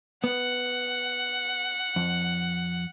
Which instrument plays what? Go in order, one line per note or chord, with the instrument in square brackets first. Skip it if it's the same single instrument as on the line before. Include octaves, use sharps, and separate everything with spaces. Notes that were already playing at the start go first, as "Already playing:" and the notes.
[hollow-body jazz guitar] B3 [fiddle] F#5
[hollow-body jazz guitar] F2